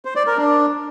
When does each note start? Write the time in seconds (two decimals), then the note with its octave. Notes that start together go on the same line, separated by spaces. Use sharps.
0.05 C5
0.16 D5
0.27 A#4
0.37 D4